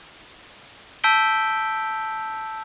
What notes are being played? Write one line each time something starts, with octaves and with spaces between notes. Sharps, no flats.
A5 E6 G6 B6 D7 G7